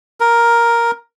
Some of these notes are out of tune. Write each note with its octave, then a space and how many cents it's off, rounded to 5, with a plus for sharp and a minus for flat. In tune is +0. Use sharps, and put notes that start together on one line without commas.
A#4 +5